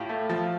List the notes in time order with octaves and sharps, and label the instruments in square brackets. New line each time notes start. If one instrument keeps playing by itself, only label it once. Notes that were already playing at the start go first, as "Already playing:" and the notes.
Already playing: [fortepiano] A2 F4 G4
A3
F3